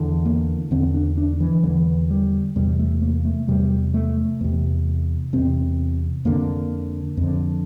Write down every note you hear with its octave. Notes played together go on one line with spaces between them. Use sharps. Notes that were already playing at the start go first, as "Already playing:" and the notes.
Already playing: E2 D3
A#3
E2 D3 C4
D4
D4
E3
E2 D3 E3
G3
E2 C3 G3
A3
A#3
A3
E2 C3 G3
A3
E2 C3
E2 C3 C4
F2 D3 A#3
F2 D3